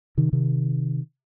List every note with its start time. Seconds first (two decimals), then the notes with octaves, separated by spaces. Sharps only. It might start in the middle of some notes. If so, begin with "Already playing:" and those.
0.17 C3 D#3
0.33 C3 D#3